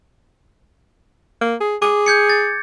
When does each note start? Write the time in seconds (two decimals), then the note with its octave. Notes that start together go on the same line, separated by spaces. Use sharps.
1.42 A#3
1.61 G#4
1.82 G#4 D6
2.06 G6 G#6 C#7
2.30 A6